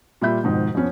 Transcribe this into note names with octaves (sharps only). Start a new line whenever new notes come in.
A#2 G3 F4 E5 B5 G6
F2 G#2 B2 D#3
F2 F3 B3 C#4